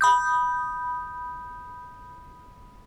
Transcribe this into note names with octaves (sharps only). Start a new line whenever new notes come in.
B5 D#6 G6